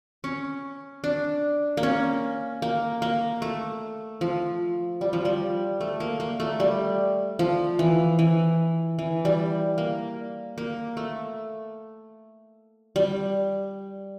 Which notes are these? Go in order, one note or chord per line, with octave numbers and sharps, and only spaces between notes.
C#4
D4
A#3
C#4
A#3
A#3
A3
F3
G3
F3
G3
A3
A#3
A#3
A3
G3
F3
E3
E3
E3
G3
A#3
A#3
A3
G3